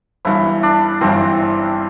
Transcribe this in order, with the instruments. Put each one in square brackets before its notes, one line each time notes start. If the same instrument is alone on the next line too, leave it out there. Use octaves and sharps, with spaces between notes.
[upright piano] G1 G2 E3 [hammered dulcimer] E4
[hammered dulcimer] D4
[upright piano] G1 G2 E3 [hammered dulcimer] C4